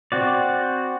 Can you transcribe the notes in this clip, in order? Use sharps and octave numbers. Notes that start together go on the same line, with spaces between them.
C4 F#4 D5